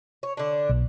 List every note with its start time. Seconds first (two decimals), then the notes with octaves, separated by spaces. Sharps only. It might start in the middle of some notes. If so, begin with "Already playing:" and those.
0.23 C#5
0.37 D3 D4
0.69 B1